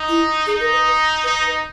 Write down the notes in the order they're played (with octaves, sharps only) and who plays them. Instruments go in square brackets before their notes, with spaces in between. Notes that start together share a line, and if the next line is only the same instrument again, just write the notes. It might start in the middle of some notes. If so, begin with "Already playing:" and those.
Already playing: [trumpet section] D#4
[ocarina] E4
[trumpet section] D#4 [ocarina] G#4
[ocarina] A#4
B4
[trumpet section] D#4 [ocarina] B4